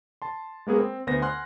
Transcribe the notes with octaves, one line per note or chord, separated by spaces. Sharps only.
A5 C6
G#3 A#3 B3 G#4 A#4
C4
D2 B3 C5 A#6
F#5 G#5 C6 F6 F#6